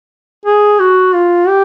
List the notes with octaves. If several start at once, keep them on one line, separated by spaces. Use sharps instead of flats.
G#4
F#4
F4
G4